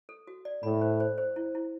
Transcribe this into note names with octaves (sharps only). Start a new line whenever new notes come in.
A4
F#4
D5
A2 B5
C5
C5
C5
E4
E4